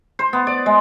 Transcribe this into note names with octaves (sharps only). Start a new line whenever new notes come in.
C5
B3
D5
G#3